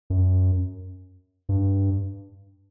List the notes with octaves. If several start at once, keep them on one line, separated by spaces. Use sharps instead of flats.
F#2
G2